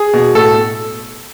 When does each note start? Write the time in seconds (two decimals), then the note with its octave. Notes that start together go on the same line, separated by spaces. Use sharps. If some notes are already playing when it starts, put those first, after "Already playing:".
Already playing: G#4
0.14 B2
0.35 A2 A4